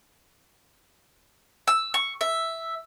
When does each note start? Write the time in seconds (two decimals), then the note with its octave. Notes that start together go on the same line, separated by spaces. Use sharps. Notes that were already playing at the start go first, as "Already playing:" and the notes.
1.67 E6
1.94 C#6
2.21 E5